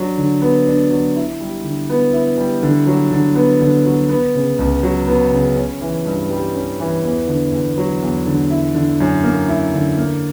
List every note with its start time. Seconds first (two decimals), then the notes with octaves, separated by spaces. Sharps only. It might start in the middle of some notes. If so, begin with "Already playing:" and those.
Already playing: F#3 D4
0.18 D3
0.42 B3
0.67 D4
0.91 F#3
1.16 E4
1.41 G3
1.64 D3
1.90 B3
2.13 E4
2.38 G3
2.63 D3
2.87 F#3
3.11 D3
3.35 B3
3.61 D3
3.85 F#3
4.09 B3
4.35 C#3
4.59 C#2
4.83 F#3
5.07 B3
5.32 C#3
5.57 C#4
5.81 E3
6.06 G2
6.30 G3
6.54 C#4
6.80 E3
7.04 E2
7.27 D3
7.52 E2
7.78 F#3
8.02 E2
8.26 D3
8.50 E4
8.74 D3
9.00 F#2
9.23 A#3
9.48 E4
9.74 D3
9.97 A#3